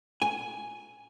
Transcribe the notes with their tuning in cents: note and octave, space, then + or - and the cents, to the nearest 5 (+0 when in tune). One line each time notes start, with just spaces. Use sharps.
G#5 +0